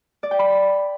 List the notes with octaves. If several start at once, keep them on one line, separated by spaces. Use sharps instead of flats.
D5
G5
B5